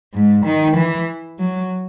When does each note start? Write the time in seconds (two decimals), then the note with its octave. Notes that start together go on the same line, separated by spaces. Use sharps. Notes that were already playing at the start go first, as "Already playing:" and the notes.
0.14 G#2
0.45 D#3
0.76 E3
1.39 F#3